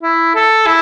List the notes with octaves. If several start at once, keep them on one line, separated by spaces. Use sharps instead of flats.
E4
A4
E4